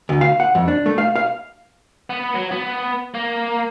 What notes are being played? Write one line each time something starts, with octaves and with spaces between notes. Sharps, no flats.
D2
F5
F#5
F2
D4
A3
F5
F5
B3
F#3
B3
A#3